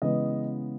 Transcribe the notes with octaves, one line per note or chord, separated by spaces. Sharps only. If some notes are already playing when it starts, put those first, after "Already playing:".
C#3 E3 G#3 B3 D#5